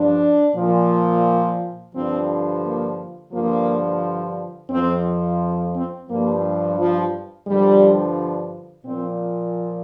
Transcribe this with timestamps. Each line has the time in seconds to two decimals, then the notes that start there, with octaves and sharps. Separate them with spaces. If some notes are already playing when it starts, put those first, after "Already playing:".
Already playing: G2 F3 D4
0.56 A#2 F3
1.94 G2 D3 F3 C4
2.63 A#3
3.32 G2 D3 F3 A#3
4.70 F2 F3 C4
5.75 C4
6.10 G2 F3 A#3
6.79 F3
7.47 G2 D3 F3 G3
8.86 A#2 F3 C4